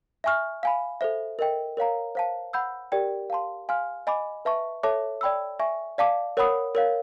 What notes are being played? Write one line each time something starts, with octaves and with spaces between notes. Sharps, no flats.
E5 G#5 C#6 F6
F5 G#5 B5
A4 C5 E5
A#4 D#5 G5
A#4 C#5 F5 A#5
C5 F5 A5
F#5 B5 E6 G6
G4 A#4 D5 G5
F5 A5 C6
F5 G#5 C6 F6
D#5 G#5 B5 D6
B4 E5 A5 C#6
A4 C#5 E5 A5 D6
D5 G5 B5 E6
E5 G#5 C#6
D5 F5 A5 D6
A#4 C#5 F#5 B5 D#6
A#4 C#5 F5